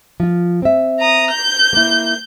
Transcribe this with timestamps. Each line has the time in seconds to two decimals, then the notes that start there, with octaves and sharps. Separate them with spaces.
0.20 F3 F4
0.62 C4 E5
1.00 A#5 D#6
1.31 G6
1.73 A#3 E4